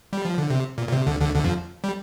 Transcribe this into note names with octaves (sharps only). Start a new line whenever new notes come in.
G3
F3
D3
C3
A#2
A#2
C3
D2 D3
D2 D3
D2 D3
F2 F3
G3